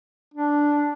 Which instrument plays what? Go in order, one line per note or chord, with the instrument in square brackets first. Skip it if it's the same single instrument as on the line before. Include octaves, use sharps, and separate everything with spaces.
[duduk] D4